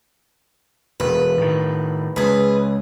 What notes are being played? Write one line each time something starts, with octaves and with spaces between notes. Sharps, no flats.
E1 B4
A2 D#3
C#2 G#4 B4